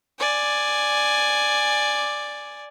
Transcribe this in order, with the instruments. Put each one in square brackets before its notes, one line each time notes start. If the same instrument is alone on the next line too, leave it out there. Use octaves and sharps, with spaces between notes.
[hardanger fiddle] D5 G#5